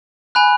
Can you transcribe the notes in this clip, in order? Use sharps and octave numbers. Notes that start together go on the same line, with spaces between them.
G#5 B5 F#6